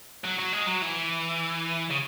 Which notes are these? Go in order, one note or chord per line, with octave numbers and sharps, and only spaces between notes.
F#3
F#3
G#3
F#3
E3
C#3